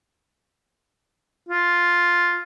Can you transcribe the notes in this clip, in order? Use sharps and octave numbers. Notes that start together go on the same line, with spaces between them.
F4